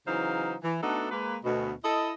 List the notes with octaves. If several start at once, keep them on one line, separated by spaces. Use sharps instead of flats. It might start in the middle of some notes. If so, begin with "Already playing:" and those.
C#3 E3 F#3 D#4 C5 F5
E3
A3 B3 D4 D#4 F#4 A4
G#3 A#3 B4
D2 B2
E4 A4 D#5